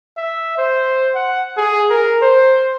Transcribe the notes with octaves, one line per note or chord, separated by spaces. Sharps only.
E5
C5
F#5
G#4
A#4
C5